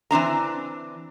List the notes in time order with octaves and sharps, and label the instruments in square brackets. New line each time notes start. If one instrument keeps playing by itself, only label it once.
[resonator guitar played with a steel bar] E3 C4 D4 A#5